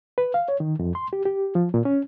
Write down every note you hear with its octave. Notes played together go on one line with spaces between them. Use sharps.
B4
F5
C#5
D#3
F2
C6
G4
G4
F3
A#2
C#4